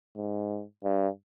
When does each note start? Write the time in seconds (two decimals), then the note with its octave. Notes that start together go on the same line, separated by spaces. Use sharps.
0.16 G#2
0.84 G2